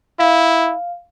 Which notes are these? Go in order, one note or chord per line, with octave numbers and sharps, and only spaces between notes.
E4 F5